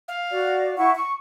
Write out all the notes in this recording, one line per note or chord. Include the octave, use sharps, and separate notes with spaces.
F5
F#4 D5
E4 F#5 C#6
C#6